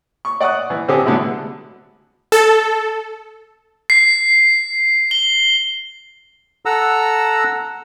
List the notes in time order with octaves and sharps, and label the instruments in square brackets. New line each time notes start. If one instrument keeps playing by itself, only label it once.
[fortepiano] C#6
D5 F#5 C#6 D#6 F#6
E3
D3 C4 G4 G#4
D3 F#3 G#3 A3 B3 E4
[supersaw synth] A4
[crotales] C7
G7
[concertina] A4 F#5 A#5 E6